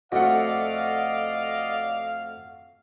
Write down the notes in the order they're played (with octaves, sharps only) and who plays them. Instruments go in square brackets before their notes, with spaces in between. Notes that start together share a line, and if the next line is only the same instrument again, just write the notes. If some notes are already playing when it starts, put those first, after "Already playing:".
[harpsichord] F2 A3 [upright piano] F#4 F#5 [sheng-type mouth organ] D5 D#5 [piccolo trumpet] F5